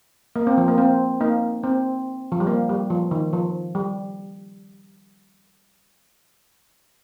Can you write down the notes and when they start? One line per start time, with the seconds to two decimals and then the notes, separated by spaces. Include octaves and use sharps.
0.36 A#3
0.47 C4
0.57 F3
0.68 A#3
0.78 C4
1.20 A#3 D#4
1.63 C4
2.32 F3
2.40 G3
2.47 A#3
2.69 G3
2.90 F3
3.11 D#3
3.33 F3
3.75 G3